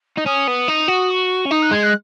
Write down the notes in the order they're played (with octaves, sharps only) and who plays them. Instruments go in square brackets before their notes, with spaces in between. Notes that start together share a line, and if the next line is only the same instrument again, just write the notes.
[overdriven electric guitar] D#4
[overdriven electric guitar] C#4 [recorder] D#6
[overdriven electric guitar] B3
D#4
F#4
[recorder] C#6
[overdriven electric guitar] C#4
[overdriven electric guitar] D#4 [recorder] D#6
[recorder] F#6
[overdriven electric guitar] G#3 [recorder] G#6
[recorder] F#6